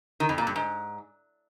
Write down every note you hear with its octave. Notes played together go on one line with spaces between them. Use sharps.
D#3
F2
A#2
G2
G#2